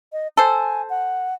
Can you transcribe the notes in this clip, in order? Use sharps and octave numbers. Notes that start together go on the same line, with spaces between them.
D#5
A4 C5 G#5
F#5